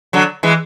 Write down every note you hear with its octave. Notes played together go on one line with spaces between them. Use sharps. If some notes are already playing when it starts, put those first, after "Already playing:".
D3 F#3
E3 G#3